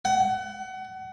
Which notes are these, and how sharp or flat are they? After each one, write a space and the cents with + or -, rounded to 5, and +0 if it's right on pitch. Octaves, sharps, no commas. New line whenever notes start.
F#5 +30